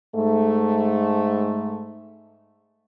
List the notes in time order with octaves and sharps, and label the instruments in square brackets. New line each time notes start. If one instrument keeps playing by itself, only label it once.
[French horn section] G#2 A3